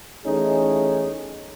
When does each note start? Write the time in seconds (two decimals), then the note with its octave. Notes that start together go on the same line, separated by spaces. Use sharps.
0.25 E2 A3 C#4 D#4 G#4